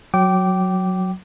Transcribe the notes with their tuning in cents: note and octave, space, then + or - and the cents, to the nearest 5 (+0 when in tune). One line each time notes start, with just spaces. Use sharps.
F#3 -5 G5 -25 D6 -5